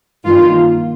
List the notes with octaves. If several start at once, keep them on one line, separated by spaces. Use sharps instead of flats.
G2 D#3 A#3 F4